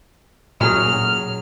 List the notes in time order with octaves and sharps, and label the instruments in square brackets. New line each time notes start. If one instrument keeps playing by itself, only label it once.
[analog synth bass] A#2 [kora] F#3 C#4 G#4 [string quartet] F6